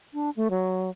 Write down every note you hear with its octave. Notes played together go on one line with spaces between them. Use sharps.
D4
A3
F#3